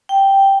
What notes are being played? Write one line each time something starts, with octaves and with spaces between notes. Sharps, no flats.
G5